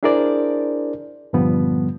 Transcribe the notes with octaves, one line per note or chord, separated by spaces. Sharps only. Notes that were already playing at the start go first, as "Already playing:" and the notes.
D4 E4 G#4 A#4 C5 D5
G2 A#2 D3 F3 G3 B3